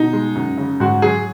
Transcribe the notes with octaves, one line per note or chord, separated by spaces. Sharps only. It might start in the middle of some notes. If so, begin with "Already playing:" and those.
Already playing: B2 D#4
G#3
F#2
C#3
G#2 F#4
F#3 G#4